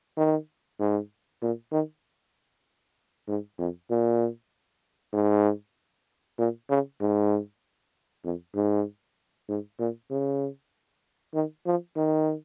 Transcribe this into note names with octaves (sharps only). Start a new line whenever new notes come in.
D#3
G#2
A#2
D#3
G#2
F2
A#2
G#2
A#2
C#3
G#2
F2
G#2
G#2
A#2
C#3
D#3
F3
D#3